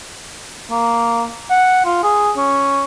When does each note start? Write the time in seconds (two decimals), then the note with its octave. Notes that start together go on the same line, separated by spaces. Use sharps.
0.71 A#3
1.50 F#5
1.85 F4
2.03 G#4
2.37 C#4